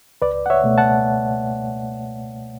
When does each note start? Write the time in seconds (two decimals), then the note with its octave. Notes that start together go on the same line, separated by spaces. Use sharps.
0.22 C#2 B4 D5
0.46 F#5
0.50 C#5 E5
0.64 B2 A3
0.78 F#5 A5